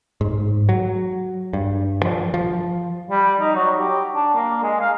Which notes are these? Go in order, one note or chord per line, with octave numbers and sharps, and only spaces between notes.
G#2
F#3
G2
F3
F3
G3
D#4
F#3
G4
D4
A#3
G#3
F5